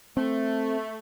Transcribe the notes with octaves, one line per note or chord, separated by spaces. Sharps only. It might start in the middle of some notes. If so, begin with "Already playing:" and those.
A3 C4